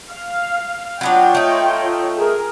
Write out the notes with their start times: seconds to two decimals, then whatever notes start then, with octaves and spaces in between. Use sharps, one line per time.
0.12 F5
1.01 F#3 B3 D4 F4 C#5 G5
1.35 A3 D#4
2.19 G#4 A#4